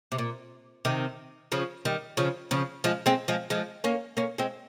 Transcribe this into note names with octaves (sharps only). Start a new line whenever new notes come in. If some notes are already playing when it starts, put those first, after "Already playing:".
C3
A#2
C3 D#3
C#3 F3
D#3 G3
C#3 F3
C#3 F3
F3 G#3
G#3 C4
F3 G#3
F3 G#3
A#3 C#4
A#3 C#4
G#3 C4